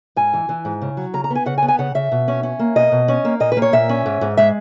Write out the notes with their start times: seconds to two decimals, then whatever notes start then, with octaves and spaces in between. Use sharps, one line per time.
0.16 G#2 G#5
0.34 E3
0.49 E3
0.65 G#2
0.81 C#3
0.97 F#3
1.14 C#3 A#5
1.24 A#5
1.30 B3
1.35 G#5
1.46 C#3 F#5
1.58 G#5
1.63 B3
1.68 G#5
1.79 C#3 F#5
1.95 C#3 E5
2.12 B2
2.28 C#4
2.43 C#4
2.59 A#3
2.76 B2 D#5
2.92 B2
3.08 C#4
3.25 A#3
3.40 A#2 D#5
3.52 B4
3.57 A#3
3.62 C#5
3.73 A#2 E5
3.89 C#4
4.06 G#2
4.21 G#2
4.37 G#3 E5